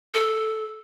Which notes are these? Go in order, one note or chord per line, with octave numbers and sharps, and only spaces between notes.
A4